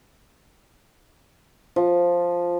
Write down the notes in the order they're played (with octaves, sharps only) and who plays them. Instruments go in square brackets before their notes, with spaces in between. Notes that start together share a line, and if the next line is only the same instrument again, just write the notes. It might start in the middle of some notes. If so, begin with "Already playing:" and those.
[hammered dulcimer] F3